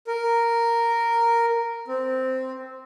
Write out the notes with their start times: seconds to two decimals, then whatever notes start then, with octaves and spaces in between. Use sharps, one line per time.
0.07 A#4
1.88 C4